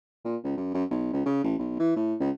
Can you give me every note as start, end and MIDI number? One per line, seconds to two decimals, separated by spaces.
0.25 0.36 46
0.44 0.55 37
0.57 0.72 42
0.74 0.84 42
0.91 1.10 35
1.13 1.25 37
1.26 1.44 49
1.44 1.55 33
1.59 1.79 35
1.79 1.92 52
1.96 2.15 45
2.20 2.30 37